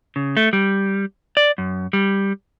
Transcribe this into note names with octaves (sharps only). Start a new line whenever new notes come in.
C#3
A3
G3
D5
F#2
G3